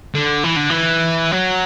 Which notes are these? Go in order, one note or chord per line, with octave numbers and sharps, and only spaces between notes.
D3
E3
D3
E3
F#3